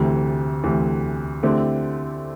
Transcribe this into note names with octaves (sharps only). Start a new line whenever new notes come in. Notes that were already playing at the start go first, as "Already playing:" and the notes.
Already playing: D2 C3 E3 A3
D2 C3 E3 A3
D3 A3 C4 E4 G4